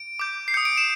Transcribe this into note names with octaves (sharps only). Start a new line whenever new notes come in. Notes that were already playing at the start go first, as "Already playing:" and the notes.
Already playing: D7
D6 G6
C7
D#6 G6 C#7
D7
E7